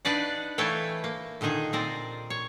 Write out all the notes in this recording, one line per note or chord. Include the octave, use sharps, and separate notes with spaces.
D4 D#4 B4 D5 F5 F#5
E3 A3 E4 C#5 F5 G5
A#3
A#2 D3 D#3 D#4 G#4
A#2 C4 A#4 D5
C#5